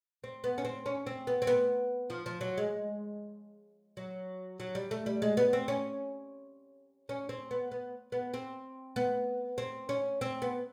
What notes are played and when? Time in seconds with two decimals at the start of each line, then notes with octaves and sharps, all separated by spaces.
0.24 C4
0.44 B3
0.58 C#4
0.65 C4
0.86 C#4
1.06 C4
1.27 B3
1.42 C4
1.47 B3
2.10 F3
2.26 F3
2.41 F#3
2.57 G#3
3.97 F#3
4.60 F#3
4.75 G3
4.91 A3
5.06 G3
5.22 G#3
5.37 B3
5.53 C4
5.68 C#4
7.09 C#4
7.29 C4
7.51 B3
7.71 B3
8.12 B3
8.34 C4
8.96 B3
9.58 C4
9.89 C#4
10.21 C4
10.42 B3